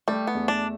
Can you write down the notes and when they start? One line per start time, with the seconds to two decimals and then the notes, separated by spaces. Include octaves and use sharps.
0.08 G3 A3
0.27 B3
0.35 E2
0.48 D4